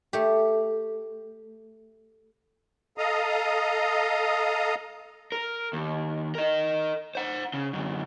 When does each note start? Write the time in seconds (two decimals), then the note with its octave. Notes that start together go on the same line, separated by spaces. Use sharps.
0.13 A3 G4
2.98 A4 D#5 F5 A#5 D#6
5.32 A#4
5.73 D#2
6.35 A#4 D#5
7.15 C5 F#5
7.54 C#3
7.73 F#2 D3